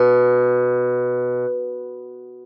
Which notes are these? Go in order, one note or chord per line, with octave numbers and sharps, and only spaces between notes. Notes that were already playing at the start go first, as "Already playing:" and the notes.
Already playing: B2